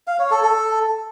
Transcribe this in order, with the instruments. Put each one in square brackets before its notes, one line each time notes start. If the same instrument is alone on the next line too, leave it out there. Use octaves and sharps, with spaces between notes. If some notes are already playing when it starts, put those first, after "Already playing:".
[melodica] F5
C#5
A4
A4